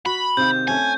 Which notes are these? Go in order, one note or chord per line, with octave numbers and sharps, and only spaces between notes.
F#4 B5
C3 D#3 F5 G6
A3 C#4 C#5 G#5